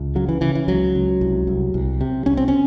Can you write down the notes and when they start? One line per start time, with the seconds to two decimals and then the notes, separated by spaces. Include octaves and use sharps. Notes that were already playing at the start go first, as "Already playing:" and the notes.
Already playing: C#2
0.15 C#3 F#3
0.29 E3
0.41 C#3 E3
0.55 E3
0.68 C#2 F#3
0.95 C#2
1.21 C2
1.47 C2
1.74 C2
2.01 C3
2.26 C2 C#4
2.37 C4
2.48 C#4